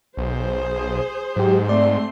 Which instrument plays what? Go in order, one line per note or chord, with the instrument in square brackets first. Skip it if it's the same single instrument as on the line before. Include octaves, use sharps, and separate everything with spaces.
[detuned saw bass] B1 [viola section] G#4 C5
[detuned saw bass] G#2 [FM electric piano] F#3 G4
[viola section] A3 C4 C6 [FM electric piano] D5